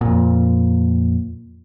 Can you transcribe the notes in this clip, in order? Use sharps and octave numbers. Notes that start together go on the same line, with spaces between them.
F2 A#2